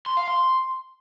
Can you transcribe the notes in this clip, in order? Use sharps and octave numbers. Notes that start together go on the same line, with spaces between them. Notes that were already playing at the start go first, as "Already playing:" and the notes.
C6
F5
C6